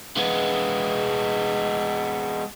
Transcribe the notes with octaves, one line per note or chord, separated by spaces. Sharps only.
G#3 B3